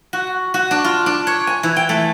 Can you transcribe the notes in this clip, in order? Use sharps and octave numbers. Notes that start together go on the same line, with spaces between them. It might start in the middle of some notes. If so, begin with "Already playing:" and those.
F#4
F#4
D4
F4
D4
C#5
G#5
E3
G5
A3